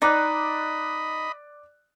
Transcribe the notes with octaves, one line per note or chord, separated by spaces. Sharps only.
D#4 D5 D#5 B5 D6 F#6